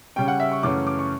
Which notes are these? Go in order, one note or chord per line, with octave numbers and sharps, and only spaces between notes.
C#3 G3 C#4 G5
F#5
E5
C#6
F#2 C#3 E3 A3 C#4 D6
D6
C#6